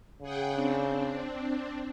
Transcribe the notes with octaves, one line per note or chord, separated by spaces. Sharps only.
C#3 G#4 F#5 G5
C4 D4